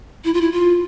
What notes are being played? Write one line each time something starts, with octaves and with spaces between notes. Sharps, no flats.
E4
F4
E4
F4